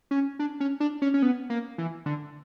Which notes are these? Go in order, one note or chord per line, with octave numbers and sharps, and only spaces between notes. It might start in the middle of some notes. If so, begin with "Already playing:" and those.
C#4
D4
C#4
D4
C#4
C#4
B3
A#3
E3
D3